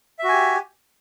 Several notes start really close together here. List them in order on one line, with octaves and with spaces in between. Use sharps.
E5 F#4 G#5 G4